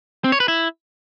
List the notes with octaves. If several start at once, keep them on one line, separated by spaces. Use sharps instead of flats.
C4
C#5
B4
E4